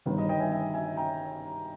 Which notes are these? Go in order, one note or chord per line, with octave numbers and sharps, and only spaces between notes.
G1 G2 D#3 B4
B4 D#5
D#5 G5
E5 G#5
E5 G#5
E5 G#5
G5 A#5